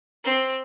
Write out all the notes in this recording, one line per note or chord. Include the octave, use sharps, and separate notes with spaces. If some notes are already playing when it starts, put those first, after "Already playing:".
C4